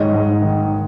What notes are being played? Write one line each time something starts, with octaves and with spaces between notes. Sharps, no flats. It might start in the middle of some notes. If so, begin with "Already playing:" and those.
Already playing: G#2 D#3 C#5 D#5
G#2
D#3